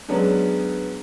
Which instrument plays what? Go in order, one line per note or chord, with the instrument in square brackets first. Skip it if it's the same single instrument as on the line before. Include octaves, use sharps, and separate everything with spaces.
[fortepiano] F#3 G#3 B3 C#4 D4